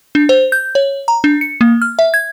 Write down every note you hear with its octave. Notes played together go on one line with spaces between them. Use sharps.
D4
C5
G6
C#5
A#5
D4
C#7
A#3
F6
E5
G#6